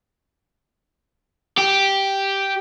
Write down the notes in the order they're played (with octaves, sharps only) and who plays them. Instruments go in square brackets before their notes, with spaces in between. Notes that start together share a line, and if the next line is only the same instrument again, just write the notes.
[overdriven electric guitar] G4